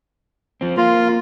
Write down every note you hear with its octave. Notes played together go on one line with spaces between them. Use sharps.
F3 C4
A#3 F4